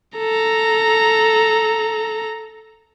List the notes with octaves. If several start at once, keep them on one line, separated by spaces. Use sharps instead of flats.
A4 A#5